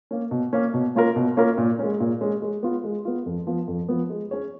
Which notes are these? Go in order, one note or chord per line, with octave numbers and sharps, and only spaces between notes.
A#3 C#4
B2
A#3 C#4
B2
A#3 C#4 F4 A#4
B2
A#3 C#4 F4 A#4
A#2
G#3 C#4
A#2
G#3 C#4
G#3
B3 F4
G#3
B3 F4
F2
F3 B3
F2
F3 B3
G#3
C#4 G#4 C#5